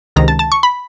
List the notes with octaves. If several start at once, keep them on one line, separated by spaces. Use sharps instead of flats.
C#2 C3 D#3 A#5
A5
A5
C#6
B5